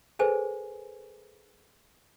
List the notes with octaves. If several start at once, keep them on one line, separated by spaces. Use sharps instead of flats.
G#4 A4 B4 C5 G#5